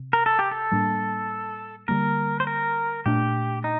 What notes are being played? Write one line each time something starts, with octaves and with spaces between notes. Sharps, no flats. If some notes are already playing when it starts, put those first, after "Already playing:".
Already playing: C3
A#4
A4
G4
A4
A2 G3 A#3 D4
D3 G3 A#3 A#4
C5
A#4
A#2 A3 D4 G4
D#4